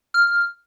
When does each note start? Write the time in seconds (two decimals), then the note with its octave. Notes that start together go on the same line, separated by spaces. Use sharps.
0.14 F6